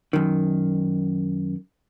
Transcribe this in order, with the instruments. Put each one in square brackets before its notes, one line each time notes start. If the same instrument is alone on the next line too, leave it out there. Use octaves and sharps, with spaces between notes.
[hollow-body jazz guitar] F#2 D#3